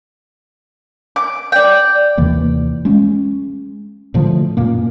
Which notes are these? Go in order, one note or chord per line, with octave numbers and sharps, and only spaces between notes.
D6
D5 G5
D#2 C3 E3 A#3
G#3 C#4
A2 D3 F3 A3
F#2 A#2 A#3